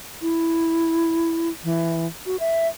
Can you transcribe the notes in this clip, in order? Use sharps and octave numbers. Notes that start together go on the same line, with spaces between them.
E4
E3
F#4
E5